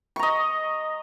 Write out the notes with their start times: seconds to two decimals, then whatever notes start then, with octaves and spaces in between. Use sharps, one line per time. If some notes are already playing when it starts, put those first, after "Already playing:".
0.16 C#6
0.19 A#5
0.23 D#5